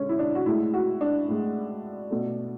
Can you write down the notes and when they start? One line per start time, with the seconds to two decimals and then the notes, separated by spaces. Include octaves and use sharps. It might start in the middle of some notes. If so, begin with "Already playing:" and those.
Already playing: D3 G#3 C#4
0.09 E4
0.19 D4
0.35 F#4
0.46 A2 G#3 E4
0.74 F#4
1.01 D4
1.28 A2 G#3
2.10 B2 A3